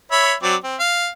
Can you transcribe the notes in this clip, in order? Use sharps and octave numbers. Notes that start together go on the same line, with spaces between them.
C#5 E5 B5
F#3 C4 D5
C4
F5